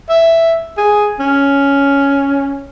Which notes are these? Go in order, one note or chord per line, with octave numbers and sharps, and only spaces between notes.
E5
G#4
C#4